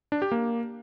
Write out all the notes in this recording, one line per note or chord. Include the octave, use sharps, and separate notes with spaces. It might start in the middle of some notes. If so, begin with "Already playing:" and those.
D4
G4
A#3